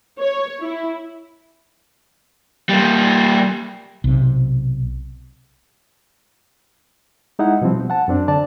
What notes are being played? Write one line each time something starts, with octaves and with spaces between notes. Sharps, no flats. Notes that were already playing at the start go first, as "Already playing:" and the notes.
C#5
E4
G3 A#3
B1 C3
G#3 D#4 E4 F#5
B2 F3 G3 C4
F#5 A5
F#2 C4 D4
D3 D5 A5